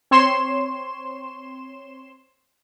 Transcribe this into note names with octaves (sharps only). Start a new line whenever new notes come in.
C4 C#5 C6 E7